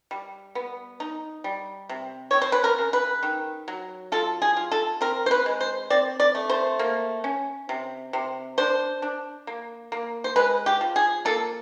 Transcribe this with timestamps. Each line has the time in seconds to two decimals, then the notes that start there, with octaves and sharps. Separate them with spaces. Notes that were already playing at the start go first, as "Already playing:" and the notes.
0.11 G3
0.55 B3
1.00 D#4
1.44 G3
1.89 C3
2.31 C4 C#5
2.41 C5
2.52 B4
2.64 A#4
2.78 C#3
2.93 B4
3.23 D#3
3.68 F#3
4.12 F4 A4
4.42 G#4
4.57 F4
4.72 A4
5.01 C4 A#4
5.26 C5
5.31 B4
5.46 G#3
5.61 C5
5.90 C4 D5
6.20 D5
6.35 A3
6.50 C5
6.79 A#3
7.24 C#4
7.69 C3
8.13 C3
8.58 D4 C5
9.02 D4
9.47 A#3
9.92 A#3
10.24 C5
10.36 G#3 B4
10.66 G4
10.81 F3
10.96 G#4
11.25 A#3 A4